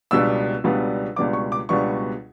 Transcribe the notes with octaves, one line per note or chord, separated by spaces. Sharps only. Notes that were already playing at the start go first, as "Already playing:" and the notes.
C#2 B2 G3 B3 D4 E6
C#2 B2 G3 B3 D4
C#2 B2 G3 B3 D4 D6
C#6
D6
C#2 B2 G3 B3 D4 C#6